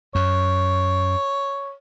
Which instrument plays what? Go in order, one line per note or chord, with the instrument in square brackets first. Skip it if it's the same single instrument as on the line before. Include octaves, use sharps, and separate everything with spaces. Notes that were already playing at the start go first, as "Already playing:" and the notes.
[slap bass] F#2 [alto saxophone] C#5